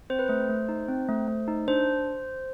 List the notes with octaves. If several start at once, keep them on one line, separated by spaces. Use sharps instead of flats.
C4 C5
B4
A3 C5
A3
D#4
C4
A3
A3
D#4
D4 C5